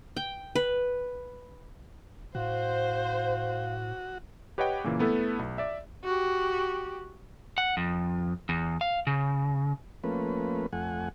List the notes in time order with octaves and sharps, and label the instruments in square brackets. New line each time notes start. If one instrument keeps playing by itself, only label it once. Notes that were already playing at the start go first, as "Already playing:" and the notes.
[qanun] G5
B4
[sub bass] A2 [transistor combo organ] F#4 [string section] C5 [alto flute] F5
[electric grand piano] G4 B4 C#5 D#5 F#5 G5
A#2 C#3 E3 A#3
A3 B3 E4 A4 B4
B1
D5 E5
[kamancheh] F#4 G4
[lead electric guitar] F#5
F2
E2
F5
C#3
[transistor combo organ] F3 A3 A#3 C#4 B4
F2 A3 F#5 G#5